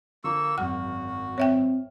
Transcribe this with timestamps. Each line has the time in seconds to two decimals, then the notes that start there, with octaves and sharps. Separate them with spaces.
0.24 D3 F3 A#3 C#6 E6
0.58 G#1 F#2 F#4 F#5 F6
1.38 C4 C#5 E5 G5